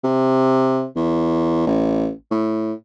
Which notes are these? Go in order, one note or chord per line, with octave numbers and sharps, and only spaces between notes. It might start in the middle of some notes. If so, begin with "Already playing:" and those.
C3
E2
A1
A2